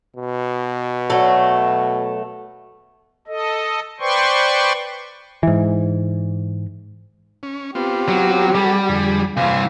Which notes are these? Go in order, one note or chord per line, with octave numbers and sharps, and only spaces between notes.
B2
F#3 A3
A4 D#5
B4 C5 D5 G5 C6 C#6
G#2 E3
C#4
B3 C4 F4 G4
F#3
G3 G#4 A4
F2 D3 G#4
C2 E3 F5 G#5 C6